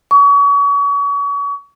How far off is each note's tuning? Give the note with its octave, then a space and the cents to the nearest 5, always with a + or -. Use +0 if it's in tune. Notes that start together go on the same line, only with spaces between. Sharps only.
C#6 +35